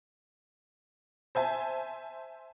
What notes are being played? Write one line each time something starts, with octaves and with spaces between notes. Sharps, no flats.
C5 E5 G#5 A5